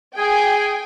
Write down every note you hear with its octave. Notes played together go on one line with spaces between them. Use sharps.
G#4 G5 G#5